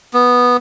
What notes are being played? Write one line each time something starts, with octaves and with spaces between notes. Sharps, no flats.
B3